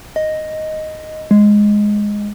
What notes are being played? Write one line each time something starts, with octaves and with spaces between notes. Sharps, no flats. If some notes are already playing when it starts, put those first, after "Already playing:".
D#5
G#3